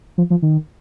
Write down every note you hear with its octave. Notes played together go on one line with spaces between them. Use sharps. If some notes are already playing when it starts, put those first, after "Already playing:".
F3
F3
D#3